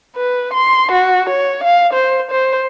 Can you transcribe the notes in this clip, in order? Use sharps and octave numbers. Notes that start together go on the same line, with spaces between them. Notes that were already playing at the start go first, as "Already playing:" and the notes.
B4
C6
F#4
C#5
F5
C5
C5